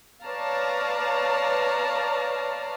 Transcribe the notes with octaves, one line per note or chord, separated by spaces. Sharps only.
B4 C#5 D5 F5 A5 A#5